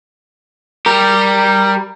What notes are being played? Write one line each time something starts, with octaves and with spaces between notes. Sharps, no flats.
G3 G4 A#4